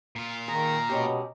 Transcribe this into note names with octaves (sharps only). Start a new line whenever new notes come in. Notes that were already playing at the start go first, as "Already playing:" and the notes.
A#2 F4
D#3 G#4 A#5
B2 G#3 C#4 G4